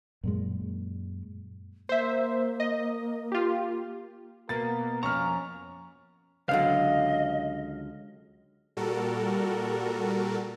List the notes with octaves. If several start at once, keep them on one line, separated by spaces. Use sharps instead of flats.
F#2 A#2 G#3
A#3 C5 E5
D#5
F4 G4
B2 A#3 B3 A#4 A6
F2 C#4 A#5 C#6 F6
C#2 D3 F#3 D#5 F5
A#2 G3 F#4 A4 A#4